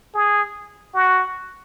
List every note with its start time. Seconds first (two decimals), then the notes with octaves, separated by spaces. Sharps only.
0.14 G#4
0.94 F#4